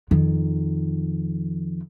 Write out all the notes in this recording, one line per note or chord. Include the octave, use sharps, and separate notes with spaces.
F2 D#3